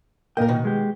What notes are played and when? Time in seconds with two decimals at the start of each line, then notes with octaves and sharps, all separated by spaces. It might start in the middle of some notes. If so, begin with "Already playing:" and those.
0.37 A#2 A#3 A#4 D#5 G5
0.48 B2 D#3
0.65 G#3 G4